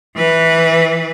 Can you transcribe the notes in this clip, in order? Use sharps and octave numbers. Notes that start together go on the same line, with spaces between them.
E3 B4